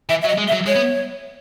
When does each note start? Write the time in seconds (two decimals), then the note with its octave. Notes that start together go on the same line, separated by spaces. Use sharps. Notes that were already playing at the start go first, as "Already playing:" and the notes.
0.09 E3 E5
0.22 E5
0.24 F#3
0.28 D#5
0.38 G#3
0.48 E5
0.52 F#3
0.66 G#3 C#5
0.75 B3